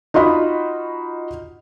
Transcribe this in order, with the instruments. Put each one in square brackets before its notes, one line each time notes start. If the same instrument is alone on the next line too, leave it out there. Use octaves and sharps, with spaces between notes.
[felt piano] D#4 F4 F#4 D#5 B5